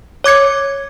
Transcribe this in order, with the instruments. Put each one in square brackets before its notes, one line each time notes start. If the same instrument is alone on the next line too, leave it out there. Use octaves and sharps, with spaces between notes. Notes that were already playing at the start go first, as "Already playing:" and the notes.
[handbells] C#5 D6 G#6 C#7